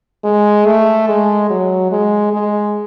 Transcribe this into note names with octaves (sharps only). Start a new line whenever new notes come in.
G#3
A3
G#3
F#3
G#3
G#3